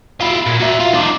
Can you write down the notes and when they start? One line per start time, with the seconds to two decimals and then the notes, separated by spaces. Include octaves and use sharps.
0.20 E4 F4
0.47 A#2
0.60 F#4 E5
0.80 F4
0.94 D#4 D5